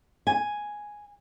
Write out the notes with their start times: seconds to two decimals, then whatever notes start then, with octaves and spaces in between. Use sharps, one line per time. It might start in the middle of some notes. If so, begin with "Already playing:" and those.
0.27 G#5